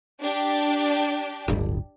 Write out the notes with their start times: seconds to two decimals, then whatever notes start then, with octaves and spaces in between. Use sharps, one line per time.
0.22 D4 G4
1.48 D1 G1